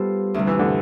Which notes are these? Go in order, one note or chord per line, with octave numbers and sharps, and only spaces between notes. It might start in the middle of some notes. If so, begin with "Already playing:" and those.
Already playing: G3 B3 F4 A4 C5
D2 C3 G3
E3
D3